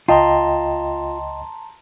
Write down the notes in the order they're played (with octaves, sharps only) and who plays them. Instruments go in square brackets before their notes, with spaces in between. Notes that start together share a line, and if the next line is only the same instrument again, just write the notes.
[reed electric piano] C#2 D#5 G5 [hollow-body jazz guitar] F4 [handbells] A5 A#5 C6